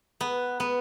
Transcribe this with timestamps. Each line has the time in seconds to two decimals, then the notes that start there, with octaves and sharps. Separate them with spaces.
0.21 B3
0.60 B3